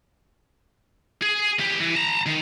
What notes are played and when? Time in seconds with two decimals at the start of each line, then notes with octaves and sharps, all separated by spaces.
1.22 G#4
1.59 E2 G4
1.80 E3
1.95 A5 A#5
2.26 D#3